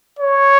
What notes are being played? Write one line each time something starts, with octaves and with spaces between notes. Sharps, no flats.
C#5